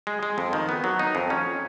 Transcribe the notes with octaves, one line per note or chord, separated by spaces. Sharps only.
G#3
G#3
F2
D#3
B3
F#3
D#4
F2
C#4